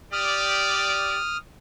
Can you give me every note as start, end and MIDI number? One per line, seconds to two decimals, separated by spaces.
0.13 1.18 67
0.13 1.18 74
0.13 1.37 87
0.13 1.37 89